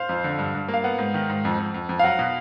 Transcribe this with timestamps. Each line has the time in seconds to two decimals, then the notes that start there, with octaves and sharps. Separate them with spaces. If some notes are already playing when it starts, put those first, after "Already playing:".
Already playing: C5 F5
0.09 F2
0.24 D3
0.39 G2
0.55 G2
0.68 A#3
0.74 F5
0.84 B3 F#5
0.99 G#2
1.14 D#3
1.29 G#2
1.45 F2
1.59 F2
1.74 F2
1.89 F2
1.99 F5
2.04 F#3 F#5
2.19 B2